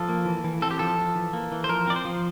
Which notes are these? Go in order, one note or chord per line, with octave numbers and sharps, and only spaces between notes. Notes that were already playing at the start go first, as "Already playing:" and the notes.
Already playing: F3 A4
A#3
E3
E3
C4 A4
G4
F3 A4
F3
E3
A#3
E3
C5
F3 A#4
C4 D5
C5
F3